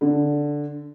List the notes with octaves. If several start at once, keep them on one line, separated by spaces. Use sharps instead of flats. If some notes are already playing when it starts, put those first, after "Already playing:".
D3